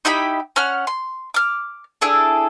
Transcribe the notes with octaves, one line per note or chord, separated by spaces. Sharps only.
D#4 E4 G4 B5
C#4 F#5 F6
C6
D6 F6
D4 E4 G#4 A4